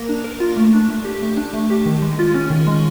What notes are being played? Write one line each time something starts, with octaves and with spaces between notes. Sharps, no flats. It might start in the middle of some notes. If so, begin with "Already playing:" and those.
Already playing: A#3 A#4
D4
A#4
F4
A3
D4
A3
G4
A3
D4
A3
G4
D#3
G#3
F4
C#4
D#3
G#3